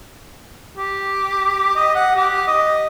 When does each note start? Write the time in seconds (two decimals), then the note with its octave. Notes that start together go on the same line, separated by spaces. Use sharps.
0.77 G4
1.76 D#5
1.95 F#5
2.16 G4
2.47 D#5